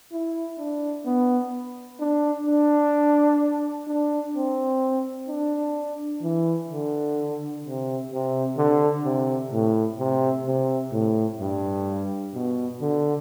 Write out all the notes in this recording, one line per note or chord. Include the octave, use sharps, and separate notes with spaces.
E4
D4
B3
D4
D4
D4
C4
D4
E3
D3
C3
C3
D3
C3
A2
C3
C3
A2
G2
B2
D3